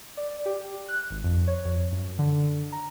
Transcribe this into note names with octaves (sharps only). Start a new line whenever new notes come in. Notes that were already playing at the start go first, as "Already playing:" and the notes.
D5
G4
F#6
G#1
F2
C#5
F2
F#2
D3
A#5